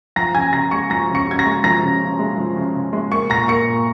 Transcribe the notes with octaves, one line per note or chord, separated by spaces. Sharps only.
F3 A#5 A#6
C#3 G#5 G#6
C#3 A#5 A#6
G#3 C#6 C#7
F3 A#5 A#6
C#3
C#6 C#7
C#3 G#6
A#5 A#6
G#3
F3 A#5 A#6
C#3
C#3
G#3
F3
C#3
C#3
G#3
A#3 C#6 C#7
A#2 A#5 A#6
A#3 C#6 C#7
A#2